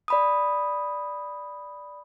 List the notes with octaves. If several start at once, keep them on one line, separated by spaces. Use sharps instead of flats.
D5 B5 D#6